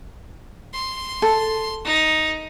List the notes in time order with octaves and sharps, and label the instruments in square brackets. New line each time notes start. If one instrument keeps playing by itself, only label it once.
[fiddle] C6
[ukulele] A4
[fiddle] D#4